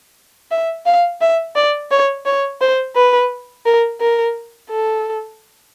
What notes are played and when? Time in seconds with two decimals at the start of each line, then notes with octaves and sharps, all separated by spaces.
0.51 E5
0.86 F5
1.21 E5
1.56 D5
1.91 C#5
2.26 C#5
2.61 C5
2.96 B4
3.66 A#4
4.01 A#4
4.70 A4